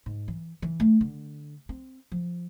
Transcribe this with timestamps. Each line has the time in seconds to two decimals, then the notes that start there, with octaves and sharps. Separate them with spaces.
0.06 G#2
0.28 E3
0.62 E3
0.80 A3
1.01 D3
1.69 C4
2.12 F3